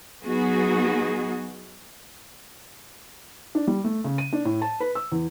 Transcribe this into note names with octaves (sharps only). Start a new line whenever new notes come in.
F#3 B3 D#4 F#4 G#4
D4
G3
A3
C#3
D#7
D4
A2
A5
B4
E6
E2